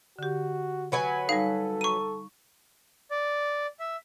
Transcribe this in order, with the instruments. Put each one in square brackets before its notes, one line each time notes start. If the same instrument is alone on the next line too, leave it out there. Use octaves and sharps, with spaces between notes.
[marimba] D3 G4 [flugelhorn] F#4
[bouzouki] F#3 B4 G#5
[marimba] G3 D#4 [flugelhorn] A4 [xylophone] F5
[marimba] A#5 [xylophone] C#6 D#7
[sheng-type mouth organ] D5
E5